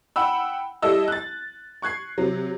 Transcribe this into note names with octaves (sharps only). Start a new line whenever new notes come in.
F#5 G5 B5 E6
G3 E4 A4 D#5 E6
F#6 A6
C#6 F#6 G#6 C7
C3 F#3